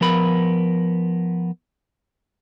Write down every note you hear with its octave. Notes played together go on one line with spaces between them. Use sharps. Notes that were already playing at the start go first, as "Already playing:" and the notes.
F3 B3 A#4 B5